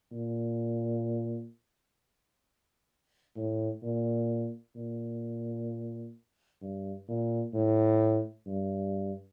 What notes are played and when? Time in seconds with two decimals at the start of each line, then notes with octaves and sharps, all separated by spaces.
0.12 A#2
3.36 A2
3.83 A#2
4.76 A#2
6.62 G2
7.08 A#2
7.54 A2
8.47 G2